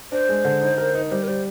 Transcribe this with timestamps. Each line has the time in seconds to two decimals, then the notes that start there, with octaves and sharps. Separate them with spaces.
0.12 D4 C5
0.29 G#3
0.45 D3
0.61 D#4
0.78 A#4
0.95 D#4
1.11 G3 C5
1.23 A#4
1.28 G3 C5